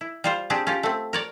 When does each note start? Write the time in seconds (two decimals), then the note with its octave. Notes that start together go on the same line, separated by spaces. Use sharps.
0.01 E4
0.24 G3 F4 C5
0.50 C4 D4 G4 G#4
0.67 C#4 F4 G4
0.83 A3 C4
1.13 A#4 C#5 D5